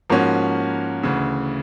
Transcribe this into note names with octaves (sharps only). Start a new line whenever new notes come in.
G#2 F3 A#3 C#4 F#4
D2 C#3 E3